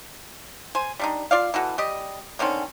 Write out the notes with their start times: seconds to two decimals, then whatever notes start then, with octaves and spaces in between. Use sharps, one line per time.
0.75 C5 G#5
0.99 G3 D4 D#4
1.31 F4 D5 F5
1.54 B2 E3 F#4 A4
1.78 G3 G4 D#5
2.39 D3 D#3 C4 C#4